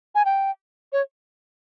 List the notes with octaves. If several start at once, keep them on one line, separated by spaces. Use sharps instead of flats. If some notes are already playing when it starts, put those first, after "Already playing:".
G#5
G5
C#5